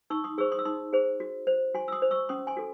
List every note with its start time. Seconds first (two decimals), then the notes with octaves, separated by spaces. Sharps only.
0.10 D#4 C#6 E6
0.24 C6 D#6
0.38 G#4 C5 C#6 E6
0.52 C6 D#6
0.59 E6
0.65 D#4 C6 D#6
0.93 G#4 C5
1.20 F#4
1.47 C5
1.75 F#4 G#5 C6
1.88 E6
1.92 C6 D#6
2.02 C5
2.11 C#6 E6
2.29 C#4 C6 D#6
2.47 G#5 C6
2.57 F#4 A4